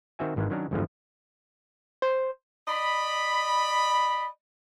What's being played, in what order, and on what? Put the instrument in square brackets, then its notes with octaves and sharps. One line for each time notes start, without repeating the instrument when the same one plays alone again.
[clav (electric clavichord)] D#3 C4 F#4 E5 G#5
G#1 G#2 D#3 E3 G#3
D#3 F#3 C#4 D4 A#4
G1 E2 G#2 B2 D3 F3
[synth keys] C5
[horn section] D5 D#5 B5